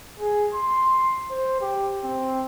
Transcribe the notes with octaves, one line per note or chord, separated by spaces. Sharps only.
G#4
C6
C5
G4
C4